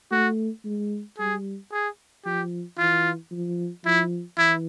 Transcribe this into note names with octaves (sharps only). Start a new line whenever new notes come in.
A3 F#4
G#3
G3 G#4
G#4
F3 G4
E3 F4
F3
F3 E4
E3 E4